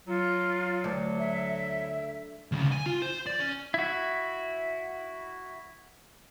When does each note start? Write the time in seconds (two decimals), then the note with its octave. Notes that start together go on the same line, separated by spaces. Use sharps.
0.07 F#3 F4
0.84 D2
1.19 E5
2.52 D2 C#3
2.72 G#5
2.86 F4
3.02 C5
3.26 D5
3.40 C#4
3.74 E4 F#4